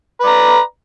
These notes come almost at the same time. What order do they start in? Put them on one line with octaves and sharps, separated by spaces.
B4 D5 A#5